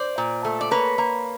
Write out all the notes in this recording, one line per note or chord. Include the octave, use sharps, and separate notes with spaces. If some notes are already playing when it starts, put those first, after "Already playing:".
Already playing: C5 D5
A#2
A3
D5
A#3 B4 C#5
A#3